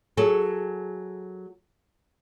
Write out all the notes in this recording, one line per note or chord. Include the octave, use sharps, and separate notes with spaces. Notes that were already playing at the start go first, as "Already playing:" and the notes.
F#3 G#4 A4